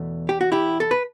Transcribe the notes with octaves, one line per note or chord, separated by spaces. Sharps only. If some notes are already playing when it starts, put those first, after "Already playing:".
Already playing: E2 B2 A3
G4
F#4
E4 G4
A4
B4